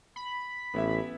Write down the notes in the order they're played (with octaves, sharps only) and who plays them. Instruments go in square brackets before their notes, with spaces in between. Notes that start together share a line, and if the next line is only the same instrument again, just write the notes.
[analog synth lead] B5
[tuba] A1 [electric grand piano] B3 E4 E5